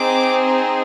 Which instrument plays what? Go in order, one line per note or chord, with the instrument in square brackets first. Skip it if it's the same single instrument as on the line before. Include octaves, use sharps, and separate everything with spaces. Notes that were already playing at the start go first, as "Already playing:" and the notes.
Already playing: [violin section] C4 D#4 G#4 D6